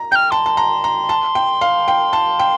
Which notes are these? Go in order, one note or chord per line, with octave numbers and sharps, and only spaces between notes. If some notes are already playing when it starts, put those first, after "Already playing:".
Already playing: A#5
G5 G6
F6
A5 C6
A5
A#5
A#5
A5
G5
F5
G5
A5
G5